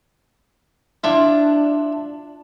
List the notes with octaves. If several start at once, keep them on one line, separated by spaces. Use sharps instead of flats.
D4 E4 F4